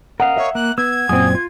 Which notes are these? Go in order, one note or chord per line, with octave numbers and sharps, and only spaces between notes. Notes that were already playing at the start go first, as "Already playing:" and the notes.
A#4 D#5 F5 F#5
C#5 E5
A#3 F#6
B3 E6 G#6
F#2 A#2 C4 G#5 D#6
F4